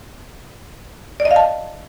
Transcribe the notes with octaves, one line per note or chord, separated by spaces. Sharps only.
D5
D#5
F5
A5